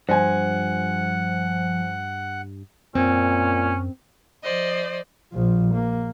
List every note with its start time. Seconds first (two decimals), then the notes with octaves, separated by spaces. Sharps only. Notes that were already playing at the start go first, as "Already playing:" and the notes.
0.09 G2 F3 C5 F#5 G#5
2.95 F#2 A#2 C4 C#4
4.44 F3 C5 D5 D#5
5.32 A#1 F3
5.74 A#3